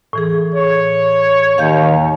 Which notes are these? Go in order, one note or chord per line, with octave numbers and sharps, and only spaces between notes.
A2 E3 G#4
C#5
D#2 F5 G6